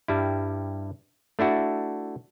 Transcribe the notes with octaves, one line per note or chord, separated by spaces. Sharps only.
G2 G3 E4
A3 D4 E4 F#4